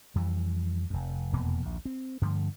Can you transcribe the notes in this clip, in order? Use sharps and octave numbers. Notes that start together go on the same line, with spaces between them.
F2 E3 G3
F1 F2
F1 E2 B2 A#3
A#1 D#2
C4
G2 D3 F3 A3